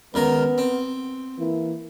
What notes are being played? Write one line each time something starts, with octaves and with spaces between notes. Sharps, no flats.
C#2 D#3 B3 A#4
C4
E3 A#3 E4